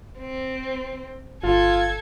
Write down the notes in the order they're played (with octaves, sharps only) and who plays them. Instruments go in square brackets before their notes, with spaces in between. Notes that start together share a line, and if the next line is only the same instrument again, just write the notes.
[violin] C4
[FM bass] G1 [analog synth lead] F4 [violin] A4 G#6